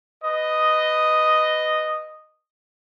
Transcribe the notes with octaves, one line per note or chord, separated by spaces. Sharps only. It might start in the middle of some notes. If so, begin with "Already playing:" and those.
B4 D#5